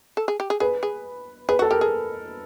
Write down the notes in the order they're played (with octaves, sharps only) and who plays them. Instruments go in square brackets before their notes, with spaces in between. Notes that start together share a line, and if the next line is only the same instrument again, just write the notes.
[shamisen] A4
G#4
G4
G#4
[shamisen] G#4 [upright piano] B4
[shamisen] G#4
[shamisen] G#4 [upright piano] B4
[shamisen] F#4
[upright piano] A4
[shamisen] G4 [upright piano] A#4
[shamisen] G#4